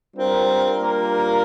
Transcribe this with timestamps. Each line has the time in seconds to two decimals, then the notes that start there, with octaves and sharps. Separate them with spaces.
0.16 G3 C4 D4 F4 A#4
0.81 A#3